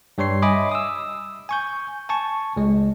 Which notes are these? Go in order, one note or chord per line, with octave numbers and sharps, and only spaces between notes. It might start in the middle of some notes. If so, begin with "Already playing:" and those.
G2 G3 C#5 C6 C7
D#5 E5 G#5 B5 D6 D#6
D#6 E6
G#5 C#6 G6
G#5 A5 C#6
C#2 G#3